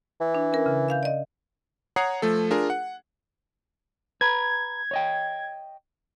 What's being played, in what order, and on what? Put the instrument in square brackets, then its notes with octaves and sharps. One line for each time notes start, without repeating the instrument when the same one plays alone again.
[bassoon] E3
[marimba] D4
C#4 A#4
C#3
E5 F5 G6
D5 D#5
[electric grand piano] C#5 F#5 A#5 D#6 G#6 C7
F3 A3 A4
D4 F4 G#4 A#4
F#5
[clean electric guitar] B4 A#5 B5 [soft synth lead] G#6
[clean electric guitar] C#5 D#5 G5